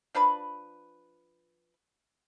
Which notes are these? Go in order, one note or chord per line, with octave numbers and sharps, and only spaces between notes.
F3 D4 B4 B5